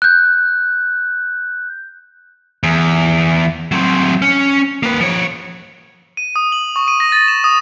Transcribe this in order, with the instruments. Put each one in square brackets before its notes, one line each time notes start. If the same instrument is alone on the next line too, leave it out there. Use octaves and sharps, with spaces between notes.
[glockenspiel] F#6 G6
[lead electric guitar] E2
F#3 C4
C#4
A#3 B4
F3 C#5
[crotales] D#7
D#6
F#7
C#6
D#7
A#6
A6
E7
D#6